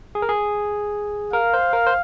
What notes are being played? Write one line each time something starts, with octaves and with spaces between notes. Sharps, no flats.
G#4
A#4
G#4
A#4 F5
C5
A#4
C5